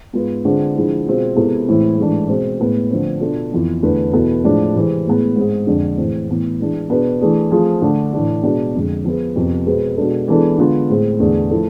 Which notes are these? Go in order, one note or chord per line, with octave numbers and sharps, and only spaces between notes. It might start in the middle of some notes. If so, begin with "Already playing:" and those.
G#2 G#3 B3 F4 B4
D3 G#3 C4 F4 G#4
D3 F3 G#3 C4 E4
B2 G#3 C4 F4
C3 G#3 B3 E4 A4
A2 E3 G#3 C4 E4
G#2 E3 A3 D4
B2 G#3 C4
A2 G#3 B3 E4 B4
D3 F3 A3 C4
B2 B3 D4 F4 A4
F2 E3 B3 F4
E2 D3 A3 E4 B4
E2 B2 B3 E4 A4
A2 F3 G#3 D4
C3 E3 G#3 C4
A2 G#3 B3
G#2 G#3 C4 G#4
F2 D3 G#3 D4
A2 E3 G#3 C4
A2 E3 B3
E3 G#3 D4
B2 B3 D4 G#4 B4
E3 A3 D4 G#4
F3 A3 C4 F4 G#4
D3 A3 D4
A2 E3 A3 D4
B2 G#3 B3 D4
F2 D3 G#3
F3 B3 F4 G#4 B4
F2 C3 F3 B3
B2 G#3 C4 G#4 B4
B2 G#3 D4 A4
E3 G#3 B3 D4 A4
D3 G#3 B3 F4
A2 G#3 C4
E2 D3 A3 D4 G#4
F3 A3 E4 A4